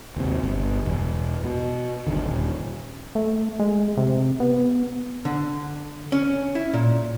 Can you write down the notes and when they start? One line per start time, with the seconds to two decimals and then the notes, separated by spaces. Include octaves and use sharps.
0.17 D#2 C3
0.44 G1
0.85 E1
1.44 B2
2.07 G1 D2 D3 D#3
2.24 D#1
3.15 A3
3.59 G#3
3.97 C3
4.40 B3
5.25 D3
6.12 C#4
6.55 E4
6.74 A#2